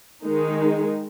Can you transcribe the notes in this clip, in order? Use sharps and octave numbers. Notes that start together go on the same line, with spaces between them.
D#3 G#3 D#4